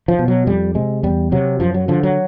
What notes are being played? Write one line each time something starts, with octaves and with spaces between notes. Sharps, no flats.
F3
B2
F#3
F2 G3
C3 G#3
E2 G3
C3 F#3
F#2 F3
F#3
D3 F3
F#3